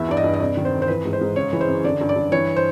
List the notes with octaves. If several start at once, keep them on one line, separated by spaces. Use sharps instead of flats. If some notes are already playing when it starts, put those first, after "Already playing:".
Already playing: E2 E3 E5
G2 D5
D#5
G2
D#5
C3 D5
D#3
C5
F2
C5
E3 B4
G#2
C5
G#2
C#3 C#5
E3
C5
F#2
D3 D5
G2
D5
G2
E3 C#5
C5